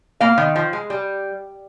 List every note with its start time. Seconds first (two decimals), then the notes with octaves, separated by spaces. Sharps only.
0.20 A#3 F5
0.38 D#3
0.56 F3
0.73 G#3
0.90 G3